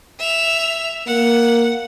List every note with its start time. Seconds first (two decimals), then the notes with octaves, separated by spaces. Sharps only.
0.19 E5 F7
1.07 A#3 F#5